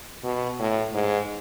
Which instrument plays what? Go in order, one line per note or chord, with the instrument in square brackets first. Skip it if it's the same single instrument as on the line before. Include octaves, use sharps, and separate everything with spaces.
[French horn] B2
A2
G#2